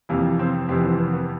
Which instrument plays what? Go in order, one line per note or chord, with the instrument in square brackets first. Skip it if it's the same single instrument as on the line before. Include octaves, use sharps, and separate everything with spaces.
[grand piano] F2 C3 E3 A#3
C4
F2 C3 E3 C4
B3
C4
B3
B3